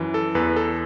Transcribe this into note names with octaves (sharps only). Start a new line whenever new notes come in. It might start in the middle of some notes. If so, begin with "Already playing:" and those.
Already playing: F#2 E3
A4
E2 B4
A4